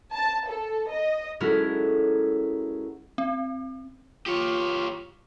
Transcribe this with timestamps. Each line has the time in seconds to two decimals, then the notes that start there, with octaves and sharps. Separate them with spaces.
0.14 A5
0.48 A4
0.90 D#5
1.40 G#3 C#4 E4 F#4 A4 A#4
3.18 C4
4.26 F4 G4 C#5